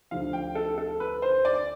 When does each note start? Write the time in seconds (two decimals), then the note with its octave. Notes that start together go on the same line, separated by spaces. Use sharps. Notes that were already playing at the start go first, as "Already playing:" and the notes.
0.11 D2 D3 F3 F5
0.33 G5
0.55 A4
0.78 A4
1.00 B4
1.22 C5
1.45 D5